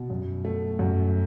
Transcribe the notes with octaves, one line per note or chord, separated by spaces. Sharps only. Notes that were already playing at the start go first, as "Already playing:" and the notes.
Already playing: B2
F#2
A3
F#2